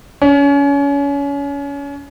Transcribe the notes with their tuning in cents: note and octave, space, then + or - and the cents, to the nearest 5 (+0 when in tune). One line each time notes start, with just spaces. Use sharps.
C#4 +30